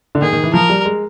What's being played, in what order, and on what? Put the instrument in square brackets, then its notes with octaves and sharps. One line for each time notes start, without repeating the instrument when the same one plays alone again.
[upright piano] D3
[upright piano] D#3 [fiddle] G#4
[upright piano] D#3
E3
[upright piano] F3 [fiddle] A#4
[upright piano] G3
G#3